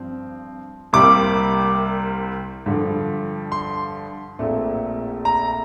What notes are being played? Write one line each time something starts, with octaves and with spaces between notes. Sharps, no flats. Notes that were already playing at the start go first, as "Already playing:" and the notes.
Already playing: G2 F3 C4
C2 C3 G3 A#3 D6
G2 D3 F3
C6
A#1 A#2 A3 C4
A#5